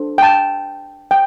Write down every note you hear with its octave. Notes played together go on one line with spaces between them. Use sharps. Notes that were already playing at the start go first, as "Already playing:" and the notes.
Already playing: D4 A4 C5
G5
A5
G5